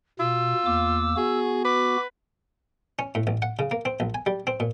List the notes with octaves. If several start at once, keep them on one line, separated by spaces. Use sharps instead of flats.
B2 F4 E6
E2 A#3 D6
B3 F#4 G#4
B4 D6
C#4
A2
A1
F#5
C#3
A#3
C4
A#1
G#5
G3
C4
A#2